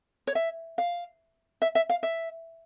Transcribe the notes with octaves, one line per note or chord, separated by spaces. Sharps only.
C#5
E5
F5
E5
E5
F5
E5